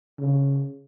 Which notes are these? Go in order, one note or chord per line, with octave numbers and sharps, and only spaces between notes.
C#3